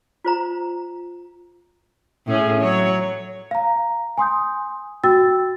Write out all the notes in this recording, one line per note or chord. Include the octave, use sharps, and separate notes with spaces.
F4 C5 A#5
A2 C#4 G#4
F#3 C#5
F5 A#5
G#5 C6 D#6 G6
F#4 G5 E6 A6